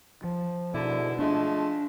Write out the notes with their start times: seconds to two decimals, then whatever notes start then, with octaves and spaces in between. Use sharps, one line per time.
0.24 F3
0.74 G#2 B2 D3 E4
1.19 F3 G#3 A3 D4